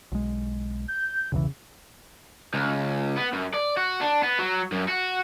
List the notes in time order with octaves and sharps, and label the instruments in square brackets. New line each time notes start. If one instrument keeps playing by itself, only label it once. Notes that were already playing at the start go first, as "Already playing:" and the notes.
[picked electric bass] B1 G#3
[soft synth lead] G6
[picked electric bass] E1 B1 E3 [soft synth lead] C#3
[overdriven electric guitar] C#2
B3
F#2
D5
F#4
D4
B3
F#3
F#2
F#4